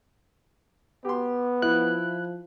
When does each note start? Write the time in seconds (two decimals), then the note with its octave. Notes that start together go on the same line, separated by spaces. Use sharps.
1.05 B3 G4 C6
1.62 F3 E4 F#6